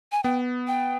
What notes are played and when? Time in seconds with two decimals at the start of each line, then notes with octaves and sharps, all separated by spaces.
0.12 G#5
0.23 B3 G5
0.67 G5